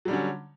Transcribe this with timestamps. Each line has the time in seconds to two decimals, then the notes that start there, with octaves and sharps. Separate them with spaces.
0.05 F#3
0.08 G3
0.10 D3
0.13 C#4